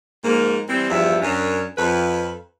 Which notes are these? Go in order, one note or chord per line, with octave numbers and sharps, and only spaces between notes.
G#2 F3 A#3
E3 G3 C4
E2 G2 F3 E5
F#2 C#4 D4 A#4
F2 B4